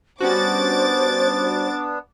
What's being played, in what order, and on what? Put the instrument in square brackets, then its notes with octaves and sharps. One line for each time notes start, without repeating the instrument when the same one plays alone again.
[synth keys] G3 C#4 F#4 [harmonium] B3 D4 [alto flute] C5 [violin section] D6 A6